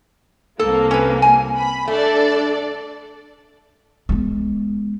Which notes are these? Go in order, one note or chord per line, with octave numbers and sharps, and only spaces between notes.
C2 A#3 A4
C#4 B4
G#5
B5
A3 D4 A4 D5
G#3 B3